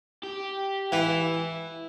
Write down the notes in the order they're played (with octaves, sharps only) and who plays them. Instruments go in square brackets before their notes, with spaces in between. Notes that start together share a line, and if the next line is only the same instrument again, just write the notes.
[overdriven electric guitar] G4
[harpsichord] E3 [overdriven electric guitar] E4